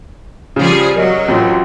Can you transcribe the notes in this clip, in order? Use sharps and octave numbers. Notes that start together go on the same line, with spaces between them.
C#3 F3 G3 G#4
F#3 A#4 D#5
A1 C4 F4